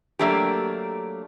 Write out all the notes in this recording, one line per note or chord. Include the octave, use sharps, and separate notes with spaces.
F#3 A3 A#3 D4 G4